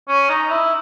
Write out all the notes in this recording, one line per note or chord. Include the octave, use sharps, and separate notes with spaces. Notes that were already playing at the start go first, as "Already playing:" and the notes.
C#4
D#4
E4